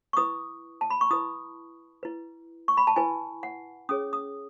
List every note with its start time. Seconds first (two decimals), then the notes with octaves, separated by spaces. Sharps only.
0.13 C#6
0.17 E4 B4 D#6
0.81 A5
0.90 B5
1.01 C#6
1.11 E4 B4 D#6
2.03 E4 B4
2.68 C#6
2.77 B5
2.87 A5
2.96 E4 B4 G#5
3.43 F#5
3.89 C#4 G#4 C#5 D#6
4.13 D#6